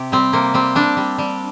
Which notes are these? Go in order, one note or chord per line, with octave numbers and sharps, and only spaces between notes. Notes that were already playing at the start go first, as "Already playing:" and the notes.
Already playing: C3 G4
G3 C4
C3 A#3
G3 C4
G3 D4
G3
G3